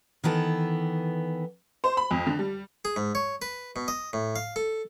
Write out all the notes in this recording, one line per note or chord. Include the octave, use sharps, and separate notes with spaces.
D#3 E3 B3 A4
C5
B5
F2
D3
G3
G#4
G#2
C#5
B4
B2
D#5
A2
F5
A4